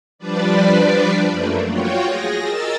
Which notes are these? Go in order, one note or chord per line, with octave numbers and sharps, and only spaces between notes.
F3 G3 D4 B4 D5
F#2 A3 A#3
F4 F#4 C#5 G5
G#4 A#6
A#4 D#5 E6 A6